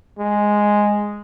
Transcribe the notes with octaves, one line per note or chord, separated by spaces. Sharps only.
G#3